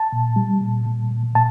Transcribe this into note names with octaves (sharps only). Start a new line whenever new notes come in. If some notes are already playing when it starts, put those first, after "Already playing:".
Already playing: A5
A#2
G3
A#2
A#2
A#2
A#2 A5